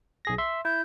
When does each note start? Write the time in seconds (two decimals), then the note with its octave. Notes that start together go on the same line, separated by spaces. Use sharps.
0.25 B1 G#4 A#6
0.38 E5 C6
0.65 E4 G6